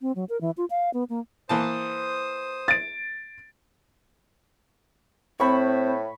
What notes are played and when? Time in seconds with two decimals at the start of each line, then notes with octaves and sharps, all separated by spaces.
0.01 C4
0.16 F#3
0.29 A#4
0.41 E3
0.57 F4
0.70 F5
0.94 B3
1.10 A#3
1.49 E3 A#3 C5 A5 D#6
2.68 A6 D7
5.40 A2 C4 C5 B5 C#6